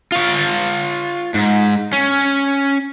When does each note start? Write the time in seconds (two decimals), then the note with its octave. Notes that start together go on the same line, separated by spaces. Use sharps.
0.12 F4 C#5
1.35 G#2
1.93 C#4